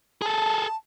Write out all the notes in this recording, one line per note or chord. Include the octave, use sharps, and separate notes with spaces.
G#4 A4 A5